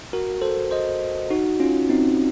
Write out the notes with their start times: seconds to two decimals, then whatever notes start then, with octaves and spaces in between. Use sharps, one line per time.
0.13 F#4 A#4
0.42 A4 C5
0.71 C5 D#5
1.30 D#4 F#4
1.60 C#4 F4
1.89 C4 D#4